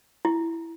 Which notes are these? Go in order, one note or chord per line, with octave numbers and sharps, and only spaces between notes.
E4